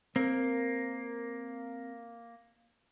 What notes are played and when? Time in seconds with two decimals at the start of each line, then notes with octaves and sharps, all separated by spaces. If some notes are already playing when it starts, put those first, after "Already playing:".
0.16 A#3 C4 A#4